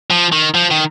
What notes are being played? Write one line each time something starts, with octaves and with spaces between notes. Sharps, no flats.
F3
D#3
F3
D#3